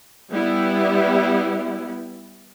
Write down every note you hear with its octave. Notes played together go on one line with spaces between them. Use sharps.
G3 B3 E4